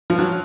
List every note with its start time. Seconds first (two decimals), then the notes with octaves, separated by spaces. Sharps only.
0.10 F3
0.19 F#3